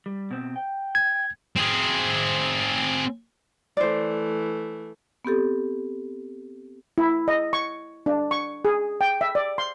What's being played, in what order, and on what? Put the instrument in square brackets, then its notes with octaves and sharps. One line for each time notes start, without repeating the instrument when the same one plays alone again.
[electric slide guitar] G3
B2 C4
G5
[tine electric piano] G#6
[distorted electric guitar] C4 G#4
[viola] E3 A3 [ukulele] C5 D5
[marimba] B3 C4 G4 A4
[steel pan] E4
D#5
C#6
D4
C#6
G#4
G5
E5
D5
C6